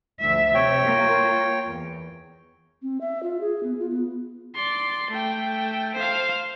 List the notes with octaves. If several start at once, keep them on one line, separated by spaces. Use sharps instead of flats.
D2 F3 E5
C3 C#5 G5
A#3 F4
E2
C4
E5
F4
G#4
B3
F4
B3
D5 C6
A3 G5
C5 F5